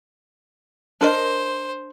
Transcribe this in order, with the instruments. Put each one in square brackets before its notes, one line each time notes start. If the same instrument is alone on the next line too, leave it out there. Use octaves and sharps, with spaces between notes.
[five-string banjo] D4 A#4 D#5 [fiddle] C5